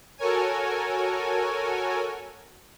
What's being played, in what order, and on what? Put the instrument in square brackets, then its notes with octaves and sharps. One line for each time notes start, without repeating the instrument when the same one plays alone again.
[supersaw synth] F#4 A4 A#4 C#5 G#5